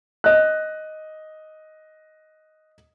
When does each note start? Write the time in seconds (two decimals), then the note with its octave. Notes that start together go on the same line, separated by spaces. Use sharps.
0.24 D#5 F#6